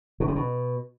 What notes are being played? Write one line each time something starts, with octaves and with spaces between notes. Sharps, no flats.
B2
C3
B2